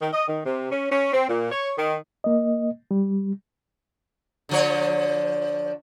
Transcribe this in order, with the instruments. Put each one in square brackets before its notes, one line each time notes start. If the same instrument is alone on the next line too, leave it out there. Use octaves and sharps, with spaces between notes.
[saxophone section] D#3
D#5
D#3
C3
C#4
C#4
C4
A#2
C#5
D#3
[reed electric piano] A#3 D#5
G3
[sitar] D3 F3 C#5